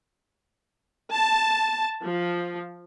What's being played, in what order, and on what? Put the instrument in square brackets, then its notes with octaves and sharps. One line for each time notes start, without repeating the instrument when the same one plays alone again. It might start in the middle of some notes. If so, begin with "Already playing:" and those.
[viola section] A5
F3